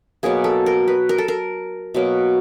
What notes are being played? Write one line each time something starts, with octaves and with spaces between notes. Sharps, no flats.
B2 F#3 A#3 G#4
A4
A#4
B4
A#4
A4
A#4
B2 F#3 A#3